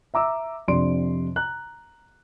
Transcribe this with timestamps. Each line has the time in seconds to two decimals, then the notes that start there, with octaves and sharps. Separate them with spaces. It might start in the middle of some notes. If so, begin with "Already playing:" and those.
0.14 E5 A#5 D6 E6
0.68 F2 C3 D4 C6 D7
1.36 A#5 F#6